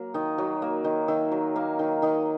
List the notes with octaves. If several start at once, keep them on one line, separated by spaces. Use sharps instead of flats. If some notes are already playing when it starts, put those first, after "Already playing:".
Already playing: F#3 A#3
D#3 D#5
F#3
A#3
D#3
D#3 E5
F#3
A#3 F5
D#3
D#3 D#5